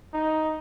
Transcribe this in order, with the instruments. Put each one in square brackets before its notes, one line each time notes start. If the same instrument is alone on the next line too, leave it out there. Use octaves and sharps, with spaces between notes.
[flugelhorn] D#4